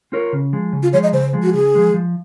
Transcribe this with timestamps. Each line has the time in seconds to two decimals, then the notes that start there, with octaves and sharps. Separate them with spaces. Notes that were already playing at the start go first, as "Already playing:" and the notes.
0.12 C4 F4 A#4 C#5
0.33 C#3
0.53 F3 G#3
0.73 C#3
0.83 F4
0.93 F3 G#3 C#5
1.03 D#5
1.13 C#3 C5
1.33 F3 G#3
1.43 F#4
1.54 C#3 G#4
1.75 F3 G#3
1.94 F3